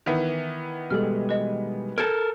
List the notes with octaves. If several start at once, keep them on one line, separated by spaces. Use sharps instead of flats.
D#3 E3 B3
B2 G3 G#3 A4 F6
B4 D#5
A4 A#4 G6 G#6